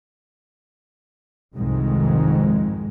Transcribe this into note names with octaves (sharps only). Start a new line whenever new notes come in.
C2 F2 G#2 D#3 G#3